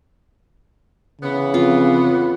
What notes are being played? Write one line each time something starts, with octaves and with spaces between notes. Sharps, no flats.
C#3 E3 B3
F2 F4